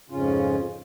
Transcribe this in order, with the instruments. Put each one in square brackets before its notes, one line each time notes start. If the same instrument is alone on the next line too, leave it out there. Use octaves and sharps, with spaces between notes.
[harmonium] F2 G#2 C#3 C#4 F4